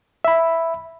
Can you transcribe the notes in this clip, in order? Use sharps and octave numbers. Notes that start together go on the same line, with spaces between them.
E5 B5